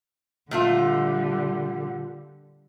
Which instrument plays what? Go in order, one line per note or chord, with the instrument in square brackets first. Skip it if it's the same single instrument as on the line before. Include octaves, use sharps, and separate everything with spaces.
[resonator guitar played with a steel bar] A#2 A3 F4 [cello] D3 G3